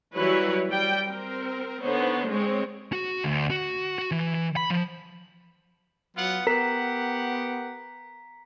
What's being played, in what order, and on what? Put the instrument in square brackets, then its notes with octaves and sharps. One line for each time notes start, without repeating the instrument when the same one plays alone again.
[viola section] E3 F#3 G3 E4 B4 C#5
G3 G5
C4 A#4
D3 B3 D#4 C5 C#5
G#3 C4 C#5
[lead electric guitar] F#4
D2
F#4
F#4
E3
B5
F3
[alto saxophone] F#3 [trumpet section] B3 F4 F#5
[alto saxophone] B3 [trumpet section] G4 F#5 [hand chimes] A#4 [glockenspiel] A#5 B6